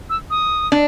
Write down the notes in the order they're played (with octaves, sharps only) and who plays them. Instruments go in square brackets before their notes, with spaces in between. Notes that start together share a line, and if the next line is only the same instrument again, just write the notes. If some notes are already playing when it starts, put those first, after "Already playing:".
[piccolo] E6
D#6
[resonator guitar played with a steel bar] D4